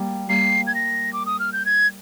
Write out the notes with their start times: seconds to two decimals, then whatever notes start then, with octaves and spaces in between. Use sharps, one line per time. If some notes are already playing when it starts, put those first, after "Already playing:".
Already playing: G3 A#3
0.29 G3 A#3 C7
0.67 G#6
0.75 A#6
1.13 D6
1.26 D#6
1.40 F6
1.53 G6
1.66 G#6